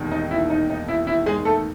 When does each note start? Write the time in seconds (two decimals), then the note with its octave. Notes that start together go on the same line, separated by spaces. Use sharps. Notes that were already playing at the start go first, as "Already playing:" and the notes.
Already playing: E1 D#2 D#3
0.12 D#4
0.31 E4
0.50 D#4
0.70 D#4
0.88 E4
1.07 E4
1.26 G#3 G#4
1.45 A3 A4